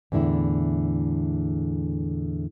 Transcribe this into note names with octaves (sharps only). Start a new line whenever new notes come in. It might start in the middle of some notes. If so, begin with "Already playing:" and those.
E2 A2 D3 E4